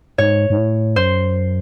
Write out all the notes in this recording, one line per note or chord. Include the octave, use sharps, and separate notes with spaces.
G#2 C#5
G#2
A2
F#2 C5